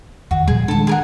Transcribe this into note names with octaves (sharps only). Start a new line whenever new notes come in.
E2 D#3 F#4
A#2 F3 G3 G#4
D#3 G#3 D4 A4 A5
G#4 A#4 F#5